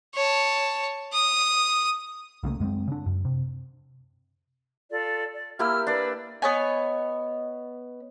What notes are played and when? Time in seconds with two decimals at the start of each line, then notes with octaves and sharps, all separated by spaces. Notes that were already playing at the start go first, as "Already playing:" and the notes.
0.15 C#5 A5
1.13 D#6
2.43 C2 C#3 A3 A#3
2.60 F#2 G#3 B3 C4
2.88 C#3 D4
3.06 F#2
3.25 C3
4.90 F4 A4 D5
5.33 D5
5.59 A#3 E4 G4 E6 F6
5.87 D4 B4 D5
6.42 B3 C#5 D#5 G#5